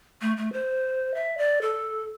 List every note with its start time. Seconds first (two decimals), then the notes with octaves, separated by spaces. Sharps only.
0.22 A3
0.37 A3
0.53 C5
1.14 E5
1.38 D5
1.62 A4